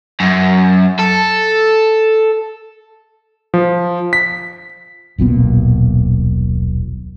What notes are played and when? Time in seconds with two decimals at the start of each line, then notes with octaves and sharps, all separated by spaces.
0.20 F#2
0.99 A4
3.54 F3
4.13 B6
5.18 D#1 B1 A#2 B3